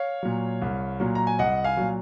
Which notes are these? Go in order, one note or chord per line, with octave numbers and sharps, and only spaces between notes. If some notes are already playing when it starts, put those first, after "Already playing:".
Already playing: C#5 F5
A#2 F#3
C2
A#2 F#3
A#5
G#5
C2 D#5 F#5
F5 G#5
A#2 F#3